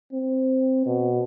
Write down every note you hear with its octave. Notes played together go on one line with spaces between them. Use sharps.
C4
B2